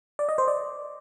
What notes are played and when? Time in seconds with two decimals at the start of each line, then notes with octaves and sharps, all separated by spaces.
0.19 D5
0.29 D#5
0.38 C5
0.48 D5